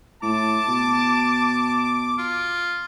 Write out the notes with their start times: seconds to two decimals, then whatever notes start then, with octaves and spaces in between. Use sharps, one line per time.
0.23 A2 A5 D6
0.68 B2
2.18 F4